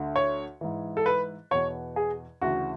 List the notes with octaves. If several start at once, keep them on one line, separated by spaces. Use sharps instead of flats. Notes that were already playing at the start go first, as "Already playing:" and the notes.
Already playing: D2 D3
C#5
G#2 E3
A4
B4
E2 B2 C#5
G#4
D2 C#3 E3 F#4